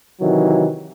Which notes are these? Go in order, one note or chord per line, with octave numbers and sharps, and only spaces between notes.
C3 D#3 E3 F#3